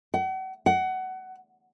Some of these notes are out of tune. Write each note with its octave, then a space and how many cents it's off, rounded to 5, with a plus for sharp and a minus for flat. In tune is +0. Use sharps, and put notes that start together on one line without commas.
F#5 +40
F#5 +20